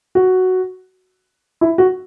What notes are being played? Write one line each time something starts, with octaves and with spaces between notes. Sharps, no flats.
F#4
E4
F#4